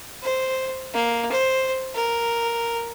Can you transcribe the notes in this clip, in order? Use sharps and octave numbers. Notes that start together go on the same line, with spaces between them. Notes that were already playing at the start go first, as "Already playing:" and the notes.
C5
A#3
C5
A#4